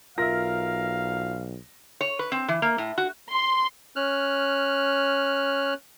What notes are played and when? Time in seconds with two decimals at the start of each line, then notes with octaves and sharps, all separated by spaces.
0.18 B1 F4 A#4 E5 F5 A#6
2.01 C#5
2.19 B4
2.32 C4
2.48 E3
2.62 A#3
2.78 A2
2.98 F#4
3.30 C6
3.96 C#4 F6 F#6